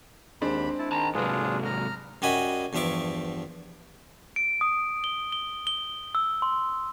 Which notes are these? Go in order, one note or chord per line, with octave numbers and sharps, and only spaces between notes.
D#2 G#3 C4 D4 B5
E4 A5
D#3 A5 A#5
G#2 C3 F#3 D4 F4 G#4 B4
A#5 F6
F#2 G3 F#4 D#5 G#5 B5
E2 G2 F3 E5 C#6 D6
D7
D#6
G7
G7
G7
E6
C6